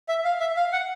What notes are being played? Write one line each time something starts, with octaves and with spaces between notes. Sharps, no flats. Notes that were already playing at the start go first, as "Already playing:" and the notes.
E5
F5
E5
F5
F#5